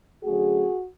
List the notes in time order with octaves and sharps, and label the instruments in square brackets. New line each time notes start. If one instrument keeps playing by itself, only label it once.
[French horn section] D3 F#3 A3 C#4 F#4 G#4